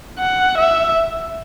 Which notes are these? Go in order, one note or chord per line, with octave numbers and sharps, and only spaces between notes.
F#5
E5